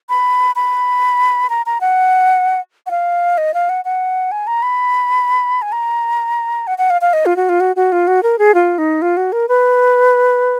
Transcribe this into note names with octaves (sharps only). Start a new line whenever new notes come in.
B5
B5
A#5
A#5
F#5
F#5
F5
D#5
F5
F#5
F#5
G#5
A#5
B5
G#5
A#5
F#5
F#5
F5
F5
D#5
F4
F#4
F4
F#4
F#4
F4
F#4
A#4
G#4
F4
D#4
F4
F#4
A#4
B4